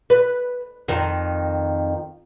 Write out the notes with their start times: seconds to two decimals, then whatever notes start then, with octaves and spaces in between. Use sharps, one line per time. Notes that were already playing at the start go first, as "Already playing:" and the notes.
0.10 B4
0.88 F2 D#3